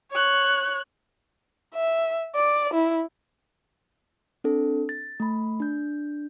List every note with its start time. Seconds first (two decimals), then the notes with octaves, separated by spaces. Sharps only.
0.12 C#5 F#6
1.75 E5
2.35 D5
2.74 E4
4.44 C4 D4 A4
4.89 A6
5.20 A3 B5
5.60 D4 G6